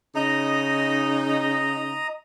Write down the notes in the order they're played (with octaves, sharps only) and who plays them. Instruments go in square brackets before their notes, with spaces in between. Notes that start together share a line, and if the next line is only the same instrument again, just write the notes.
[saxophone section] C#3 D#4 [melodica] D#5 A#5